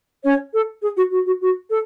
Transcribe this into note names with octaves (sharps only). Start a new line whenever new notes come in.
C#4 C#5
A4
G#4
F#4
F#4
F#4
F#4
A4